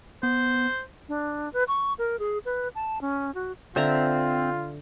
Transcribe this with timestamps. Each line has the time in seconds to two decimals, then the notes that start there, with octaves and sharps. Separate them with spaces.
0.23 B3 C5
1.09 D4
1.53 B4
1.68 C#6
1.98 A#4
2.19 G#4
2.45 B4
2.75 A5
3.01 C#4
3.34 F#4
3.76 D3 C4 F4 E5 A#5